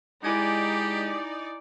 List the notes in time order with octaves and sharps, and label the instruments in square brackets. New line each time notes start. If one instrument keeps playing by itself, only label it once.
[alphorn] G#3 [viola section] D#4 D5 [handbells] E4 G#5 G#6 [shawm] G4